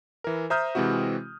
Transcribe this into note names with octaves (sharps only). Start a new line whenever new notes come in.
E3 A#4
C5 E5 A#5 D#6 F6 G6
C3 E3 G#3 C4 E4 F#4